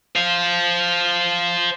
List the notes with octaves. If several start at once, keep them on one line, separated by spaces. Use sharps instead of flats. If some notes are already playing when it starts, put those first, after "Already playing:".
C5 F5